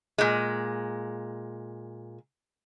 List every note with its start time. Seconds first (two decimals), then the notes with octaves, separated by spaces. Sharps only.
0.18 A#2 G#3